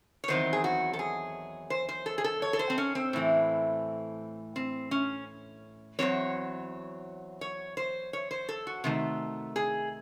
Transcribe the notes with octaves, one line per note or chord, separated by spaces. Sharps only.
C#5
E2 D#3 F#3 C4 C5
G#4
F#4
A4
G#4
C5
C5
A4
G#4
A4
C#5
A4
C5
C4
C#4
C4
A2 E3 A3
C4
C#4
E2 C3 F#3 C4 C#5
C#5
C5
C#5
C5
A4
F#4
C3 D#3 A3
G#4